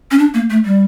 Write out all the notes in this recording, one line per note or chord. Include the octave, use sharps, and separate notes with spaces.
C#4
D4
A#3
A3
G3